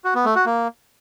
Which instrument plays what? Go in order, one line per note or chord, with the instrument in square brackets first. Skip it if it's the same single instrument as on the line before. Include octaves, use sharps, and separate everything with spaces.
[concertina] F#4
B3
A3
F#4
A#3